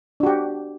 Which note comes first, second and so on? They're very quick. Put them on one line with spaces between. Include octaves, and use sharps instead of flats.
D4 F#4 G4